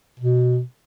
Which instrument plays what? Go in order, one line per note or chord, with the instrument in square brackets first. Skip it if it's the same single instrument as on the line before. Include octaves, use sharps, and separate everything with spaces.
[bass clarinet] B2